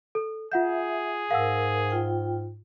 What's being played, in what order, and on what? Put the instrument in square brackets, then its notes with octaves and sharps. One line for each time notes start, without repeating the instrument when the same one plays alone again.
[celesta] A4
[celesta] F4 F#5 G6 [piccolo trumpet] G#4 [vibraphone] E5
[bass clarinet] G#2 [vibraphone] A#4 [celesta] F5 F#5 E6
[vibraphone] F4 G5